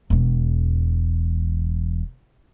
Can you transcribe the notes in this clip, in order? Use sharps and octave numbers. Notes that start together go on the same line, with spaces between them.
E1 E2